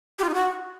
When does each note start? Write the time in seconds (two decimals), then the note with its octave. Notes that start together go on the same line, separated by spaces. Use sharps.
0.19 G4
0.24 F4
0.29 D#4
0.34 F#4